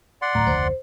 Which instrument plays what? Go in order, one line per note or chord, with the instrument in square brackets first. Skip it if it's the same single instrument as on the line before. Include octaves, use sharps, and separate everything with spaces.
[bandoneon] D5 F#5 C6
[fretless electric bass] D1 A2 [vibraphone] A#5
[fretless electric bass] F1 D2 [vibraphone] C5